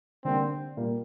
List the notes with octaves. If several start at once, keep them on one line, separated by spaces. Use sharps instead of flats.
D3 G3 A#3 C4 D4
A#2 G3 A#3